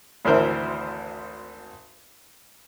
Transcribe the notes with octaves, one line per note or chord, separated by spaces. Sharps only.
G#1 D2 E3 A#4 C5 E5